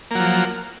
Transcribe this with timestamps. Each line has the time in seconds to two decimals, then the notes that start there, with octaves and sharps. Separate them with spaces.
0.11 A#3
0.15 F#3
0.20 F3